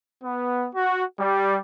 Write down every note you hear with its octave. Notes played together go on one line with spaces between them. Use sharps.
B3
F#4
G3